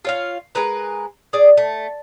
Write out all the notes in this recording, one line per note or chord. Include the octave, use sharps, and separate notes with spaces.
F4 C#5 F5
G#3 A#4 B4 A#5
G#4 D5
A3